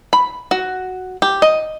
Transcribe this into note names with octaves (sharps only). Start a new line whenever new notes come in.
B5
F#4
G4
D#5